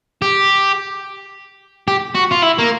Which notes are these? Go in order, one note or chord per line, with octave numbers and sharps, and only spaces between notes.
G4
G4
F#4
F4
E4
A#3